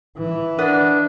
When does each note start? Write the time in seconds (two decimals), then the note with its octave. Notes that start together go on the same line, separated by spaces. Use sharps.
0.17 E3
0.59 D4 B4 D#5 F#5